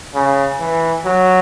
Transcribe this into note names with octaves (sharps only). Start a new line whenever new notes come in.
C#3
E3
F#3